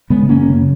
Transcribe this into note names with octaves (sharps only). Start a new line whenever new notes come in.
C#3 G#3 B3
F#2 A#3 C#4
C#3